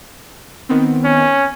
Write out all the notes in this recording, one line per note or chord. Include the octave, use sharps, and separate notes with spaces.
D#3 B3 C4
C#4